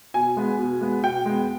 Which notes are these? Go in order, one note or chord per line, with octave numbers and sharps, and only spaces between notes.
B2 G#5
G#3 B3
B2
G#3 B3
B2 G5
G#3 B3